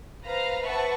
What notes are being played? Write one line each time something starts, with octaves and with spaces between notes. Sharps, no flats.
B4 C5 F5 A#5
B4 C5 E5 F#5 A5 C#6